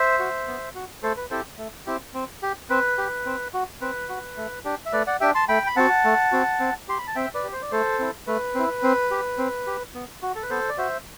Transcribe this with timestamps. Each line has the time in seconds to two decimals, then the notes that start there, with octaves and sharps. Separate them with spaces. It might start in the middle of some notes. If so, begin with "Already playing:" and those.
Already playing: C5 E5
0.19 F#4
0.47 B3
0.75 F#4
1.03 A3 A4 C5
1.17 B4
1.30 C4 E4 G4 A4 C5
1.58 A3
1.87 C4 E4 G4
2.14 C4
2.43 G4
2.70 C4 B4
2.98 G4
3.26 C4
3.54 F#4
3.81 C4 B4
4.09 F#4
4.37 A3
4.65 D4 G4
4.86 E5
4.93 A3 B4 D5
5.07 D5 F#5
5.20 D4 G4 E5 G5
5.35 A5 C6
5.49 A3 G5 B5
5.67 B5
5.76 C4 F#4 F#5 A5
6.04 A3
6.32 C4 F#4
6.60 C4
6.88 G4 C6
6.98 B5
7.07 A5
7.16 C4 E5 G5
7.34 B4 D5
7.44 G4
7.53 C5
7.62 D5
7.72 A3 A4 C5
7.99 C4 E4
8.27 A3 B4
8.55 C4 E4
8.83 C4
9.11 G4
9.38 C4
9.67 G4
9.95 B3
10.22 F#4
10.35 A4
10.43 B4
10.50 B3 A4 C5
10.69 D5
10.78 F#4 C5 E5